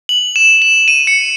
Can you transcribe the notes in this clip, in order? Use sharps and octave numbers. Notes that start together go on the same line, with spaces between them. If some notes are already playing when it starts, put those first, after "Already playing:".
F#7
E7
E7
D#7
C#7